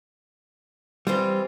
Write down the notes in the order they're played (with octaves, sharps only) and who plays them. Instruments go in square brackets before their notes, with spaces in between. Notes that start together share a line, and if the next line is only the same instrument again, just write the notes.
[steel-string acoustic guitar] E3 C4 F4 [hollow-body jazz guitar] G3